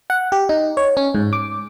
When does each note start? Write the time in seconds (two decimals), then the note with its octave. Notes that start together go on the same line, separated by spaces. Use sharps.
0.10 F#5
0.32 G4
0.49 D#4
0.77 C#5
0.97 C#4
1.15 G#2
1.33 D6